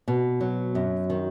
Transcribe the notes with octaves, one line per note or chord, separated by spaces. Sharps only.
B2
F#3
F#2
D#3